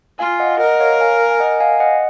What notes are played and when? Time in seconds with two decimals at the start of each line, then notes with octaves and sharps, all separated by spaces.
0.19 F4 F5 G#5
0.40 D#5 F#5
0.60 A#4 D#5 F#5
0.80 C#5 F5
1.00 F5 G#5
1.31 G#5
1.40 D#5 F#5
1.60 F5 G#5
1.80 D#5 F#5